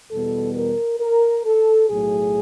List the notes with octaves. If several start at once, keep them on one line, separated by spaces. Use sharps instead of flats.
E2 B2 G3 B3 A4
A#4
A#4
A4
B1 A2 F#3 A3 G#4